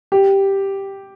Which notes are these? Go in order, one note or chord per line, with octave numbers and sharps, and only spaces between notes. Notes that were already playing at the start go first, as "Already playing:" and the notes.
G4